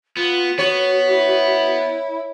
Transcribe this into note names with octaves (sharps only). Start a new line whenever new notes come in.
B3 F4
B3 F#4 C#5
E4